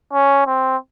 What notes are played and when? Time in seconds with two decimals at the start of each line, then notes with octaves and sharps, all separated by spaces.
0.13 C#4
0.47 C4